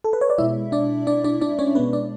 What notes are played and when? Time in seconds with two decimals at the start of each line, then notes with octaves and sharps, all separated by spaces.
0.04 A4
0.13 B4
0.21 C#5
0.30 D5
0.38 B2 G#3 E4 E5
0.72 D4 D5
1.07 D4 D5
1.24 D4 D5
1.41 D4 D5
1.59 C#4 C#5
1.75 G#3 B3 B4
1.79 B2
1.93 D4 D5